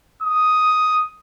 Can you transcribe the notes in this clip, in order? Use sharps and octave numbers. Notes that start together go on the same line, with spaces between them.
D#6